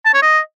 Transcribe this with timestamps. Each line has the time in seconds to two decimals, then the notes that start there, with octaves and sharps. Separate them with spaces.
0.05 A5
0.14 C#5
0.22 D#5